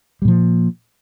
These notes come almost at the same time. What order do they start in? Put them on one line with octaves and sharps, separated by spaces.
G3 A#2 F3 A#3